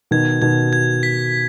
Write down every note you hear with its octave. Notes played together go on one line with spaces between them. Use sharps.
B2 D#3 G#6
B2 D#3 G#6
G#6
B6